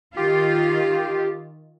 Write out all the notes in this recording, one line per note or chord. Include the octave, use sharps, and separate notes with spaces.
D#3 F4 G4